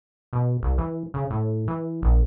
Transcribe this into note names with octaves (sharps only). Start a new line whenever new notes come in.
B2
C2
E3
C#3
A2
E3
A#1